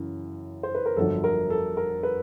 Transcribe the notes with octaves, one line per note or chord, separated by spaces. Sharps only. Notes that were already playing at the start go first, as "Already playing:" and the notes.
Already playing: F#2 C#3 E3
C5
B4
A#4
G1 F2 D3 F#3 A4
A#4
A4
A#4
B4